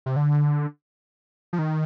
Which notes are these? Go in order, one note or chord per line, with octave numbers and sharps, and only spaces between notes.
C3
D3
F3
D#3